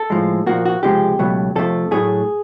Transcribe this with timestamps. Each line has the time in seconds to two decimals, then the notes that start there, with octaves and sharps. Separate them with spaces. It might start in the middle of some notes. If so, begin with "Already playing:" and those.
Already playing: A4
0.10 A2 F3 G#3
0.46 A#2 F3 A#3 F#4
0.66 F#4
0.83 C#2 C3 F3 G#3 G4
1.19 C#2 B2 F#3 A3
1.55 F2 C3 F3 A3 A4
1.91 A2 F#3 A3 G#4